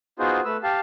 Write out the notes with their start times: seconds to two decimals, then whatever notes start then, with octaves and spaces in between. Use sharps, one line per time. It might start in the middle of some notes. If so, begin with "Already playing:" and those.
0.19 B3 D#4 F4 F#4 G#4 C5
0.45 A3 B4 E6
0.63 G4 F5 A5